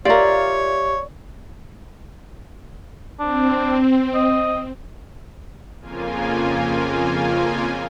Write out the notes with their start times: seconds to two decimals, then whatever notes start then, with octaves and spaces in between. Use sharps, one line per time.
0.05 F4 G4 A#4 C#5 D5 E5 F5
3.20 C4 D4
4.14 D#5
5.80 F2 C#3 A#3 F4 G#5